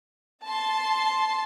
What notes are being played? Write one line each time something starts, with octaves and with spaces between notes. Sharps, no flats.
A5 C6